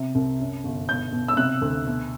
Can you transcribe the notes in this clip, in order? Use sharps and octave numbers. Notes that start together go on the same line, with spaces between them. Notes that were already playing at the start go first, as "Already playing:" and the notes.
Already playing: C3
C2
F#2
G1
B2 G6
B2
E6
C3 F#6
D2
B2